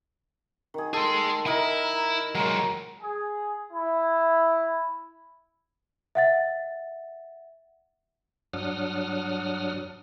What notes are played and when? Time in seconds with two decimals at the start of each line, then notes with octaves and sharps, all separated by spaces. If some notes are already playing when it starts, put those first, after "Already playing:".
0.74 D#3 G#4
0.93 G#4 A4 C6
1.46 E4 A#4 D#5
2.35 F#3 G#3 A#4 C#5
3.01 G#4
3.72 E4
6.15 E5 F#5 A6
8.53 G2 F#3 D4 F#5 D#6 F6